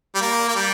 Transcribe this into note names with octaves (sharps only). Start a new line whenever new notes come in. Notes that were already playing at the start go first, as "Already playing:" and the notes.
G3
A#3
A#3
G3